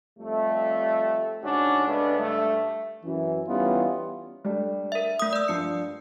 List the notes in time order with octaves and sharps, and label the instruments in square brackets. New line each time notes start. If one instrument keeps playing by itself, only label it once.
[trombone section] F2 G3 A3
G#2 C#3 C#4 D4 F#4
C#3 G#3 A3 B3 D4
G2 A3
F#2 E3
E3 G3 B3 C#4 D#4 F4
[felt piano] G3 A3 D4
[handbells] A#4 E5
A3 D#6
D5 E6
[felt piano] G2 F3 C7 [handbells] C#7